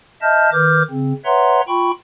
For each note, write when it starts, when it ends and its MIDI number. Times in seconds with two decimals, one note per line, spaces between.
0.22 0.50 75
0.22 0.50 76
0.22 0.50 81
0.22 0.50 89
0.22 0.50 91
0.52 0.83 51
0.52 0.83 71
0.52 0.83 86
0.52 0.83 89
0.52 0.83 91
0.90 1.13 49
0.90 1.13 60
1.25 1.61 71
1.25 1.61 73
1.25 1.61 76
1.25 1.61 78
1.25 1.61 82
1.25 1.61 84
1.68 1.91 65
1.68 1.91 79
1.68 1.91 83
1.68 1.91 85